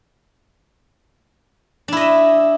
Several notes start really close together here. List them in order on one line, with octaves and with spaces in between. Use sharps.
D4 E4 D#5 E5